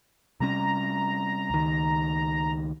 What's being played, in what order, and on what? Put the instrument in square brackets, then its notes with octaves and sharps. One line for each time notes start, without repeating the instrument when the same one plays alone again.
[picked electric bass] C3 G3 C#4 [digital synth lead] A#5
[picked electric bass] C#2 D#3